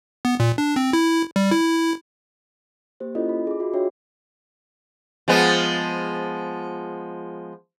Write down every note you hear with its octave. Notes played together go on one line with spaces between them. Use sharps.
B3
A#2
D4
C4
E4
G3
E4
A#3 G4 C5
C#4 E4 F4 A4 D5 D#5
B5
G#4 D6
F4 F#4 D#5 E5 B5
D4 F#4 G#4 C#5 E5 G5
F3 G#3 B3